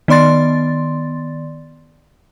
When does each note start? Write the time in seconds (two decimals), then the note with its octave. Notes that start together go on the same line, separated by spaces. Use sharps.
0.08 D#3 B3 D5 C6 A6